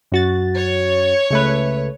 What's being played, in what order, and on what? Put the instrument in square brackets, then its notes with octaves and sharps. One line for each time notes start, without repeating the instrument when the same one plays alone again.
[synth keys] F#2 F#4 A6
[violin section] C#5
[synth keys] C#2 A3 B4